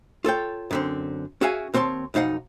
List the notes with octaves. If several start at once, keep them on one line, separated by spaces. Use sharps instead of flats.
F4 A4 C#5 G5
F#2 D3 C4
C#4 F#4 G#4 E5 F5 G#5
D#2 C4 C#5 A5 C6
B1 F2 D#4 F5 F#5